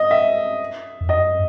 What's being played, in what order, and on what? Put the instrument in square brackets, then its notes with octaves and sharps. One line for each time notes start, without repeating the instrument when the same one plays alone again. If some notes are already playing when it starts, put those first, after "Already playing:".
Already playing: [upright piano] D#5
E5
[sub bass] F2
[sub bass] F#2 [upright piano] D#5